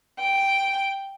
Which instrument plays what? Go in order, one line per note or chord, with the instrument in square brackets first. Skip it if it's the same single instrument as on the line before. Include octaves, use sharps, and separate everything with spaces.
[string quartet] G5